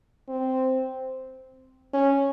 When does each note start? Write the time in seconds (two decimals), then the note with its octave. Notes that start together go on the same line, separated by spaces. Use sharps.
0.29 C4
1.93 C#4